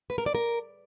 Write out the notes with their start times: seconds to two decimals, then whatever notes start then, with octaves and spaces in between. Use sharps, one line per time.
0.10 B4
0.18 A#4
0.26 D5
0.35 A#4